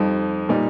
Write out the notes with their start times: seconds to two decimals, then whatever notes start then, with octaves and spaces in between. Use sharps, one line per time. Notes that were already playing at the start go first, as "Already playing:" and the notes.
Already playing: F2 F3 G3 D#4
0.49 A#2 G3 D#4